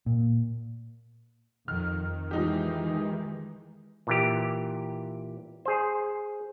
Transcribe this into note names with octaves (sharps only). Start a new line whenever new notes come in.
A#2
F2 D#3 F6
E3 F3 G#3 D#4 G4
A#2 E3 G4
G#4 C5